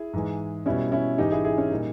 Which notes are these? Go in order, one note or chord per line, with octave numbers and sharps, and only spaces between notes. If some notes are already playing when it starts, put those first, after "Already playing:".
Already playing: E4 G#4
G#2 E3 G#3
B2 G3 C#4 E4
C#4 E4
G#2 E3 G#3 D#4 G4
E4 G#4
E4 G#4
C#4
A#2 G3 D#4